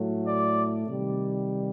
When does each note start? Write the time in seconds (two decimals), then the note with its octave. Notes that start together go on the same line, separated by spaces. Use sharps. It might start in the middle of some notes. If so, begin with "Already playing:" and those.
Already playing: A2 F#3 A3
0.26 D5
0.88 C3 D#3 G3